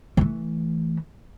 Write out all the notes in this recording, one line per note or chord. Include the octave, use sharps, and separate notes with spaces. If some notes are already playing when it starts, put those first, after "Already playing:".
E3 A3